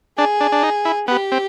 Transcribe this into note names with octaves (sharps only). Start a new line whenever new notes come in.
D4 G#4
D4
D4
D#4
E4
B3 G4
C4